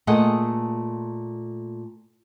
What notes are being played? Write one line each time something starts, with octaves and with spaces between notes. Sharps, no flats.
A#2 A3 G#4 D#5 F#5